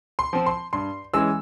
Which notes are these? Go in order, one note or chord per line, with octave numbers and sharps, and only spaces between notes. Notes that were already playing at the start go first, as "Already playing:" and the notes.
C6
F3 C4
C6
G2 C6
E3 G#3 C#4 E6